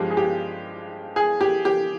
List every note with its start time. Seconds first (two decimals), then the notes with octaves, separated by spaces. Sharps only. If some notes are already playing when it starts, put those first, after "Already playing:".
Already playing: G2 F3 G#3 G4
0.11 G#4
0.17 G4
1.16 G#4
1.41 G4
1.65 G4